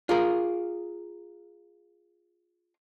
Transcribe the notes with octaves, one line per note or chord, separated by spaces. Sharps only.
F4 G#4 A#4